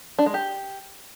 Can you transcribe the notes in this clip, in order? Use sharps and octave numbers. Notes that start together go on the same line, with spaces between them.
D4
G#3
G4